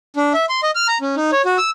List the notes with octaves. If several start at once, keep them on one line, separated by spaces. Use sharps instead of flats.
D4
E5
C6
D#5
F6
A#5
C#4
D#4
C#5
F#4
E6